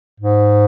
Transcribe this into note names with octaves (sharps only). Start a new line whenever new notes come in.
G#2